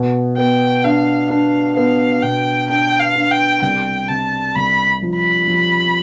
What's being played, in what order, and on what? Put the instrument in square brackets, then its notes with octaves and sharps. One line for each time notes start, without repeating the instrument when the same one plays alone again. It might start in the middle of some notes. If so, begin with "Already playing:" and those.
Already playing: [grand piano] B2
[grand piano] B3 [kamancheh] G5
[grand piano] D4 [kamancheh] F5
[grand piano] D4 [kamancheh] F5
[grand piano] B3 [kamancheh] F5
[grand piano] B2 [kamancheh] G5
[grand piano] D4 [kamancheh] G5
[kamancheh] F5
[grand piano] D4
[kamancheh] G5
[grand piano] C2 [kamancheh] G5
[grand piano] C3 [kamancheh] A5
[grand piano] C2 [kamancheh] B5
[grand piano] F3
[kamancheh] B5
[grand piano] F3